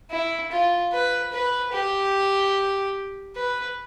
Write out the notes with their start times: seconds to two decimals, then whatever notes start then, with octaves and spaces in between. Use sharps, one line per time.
0.11 E4
0.52 F4
0.93 B4
1.33 B4
1.73 G4
3.36 B4